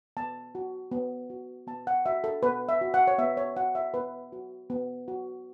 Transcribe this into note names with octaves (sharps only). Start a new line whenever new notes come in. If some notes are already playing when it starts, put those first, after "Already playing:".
B3 A5
F#4
B3
F#4
B3 A5
F#5
F#4 E5
A4
B3 B4
E5
F#4
F#5
C#5
B3 E5
C#5
F#4 F#5
E5
B3 B4
F#4
B3
F#4